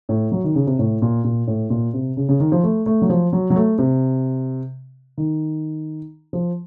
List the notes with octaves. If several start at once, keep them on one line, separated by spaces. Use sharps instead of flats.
A2
F#3
D#3
C#3
C3
A2
A#2
A#2
A2
A#2
C3
C#3
C#3
D#3
F3
A3
A3
F#3
F3
F#3
F#3
A3
C3
D#3
F3